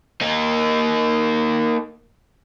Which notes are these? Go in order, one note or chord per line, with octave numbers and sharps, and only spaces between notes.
A#3 D#4